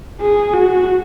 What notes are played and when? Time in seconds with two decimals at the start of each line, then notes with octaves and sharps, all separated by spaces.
0.21 G#4
0.53 F#4